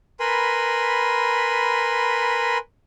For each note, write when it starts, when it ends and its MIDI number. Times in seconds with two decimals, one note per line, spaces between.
0.20 2.58 70
0.20 2.58 71
0.20 2.58 80
0.20 2.58 83
0.20 2.58 84